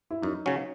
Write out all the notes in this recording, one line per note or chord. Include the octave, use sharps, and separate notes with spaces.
E4
F#2 D#4
C#3 F#3 C#4